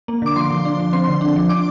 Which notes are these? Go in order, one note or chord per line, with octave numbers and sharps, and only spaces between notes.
A#3
D3 D6
F3 C6
F3
D4
F3
C4 C6
D3
D4
F3
D4 D6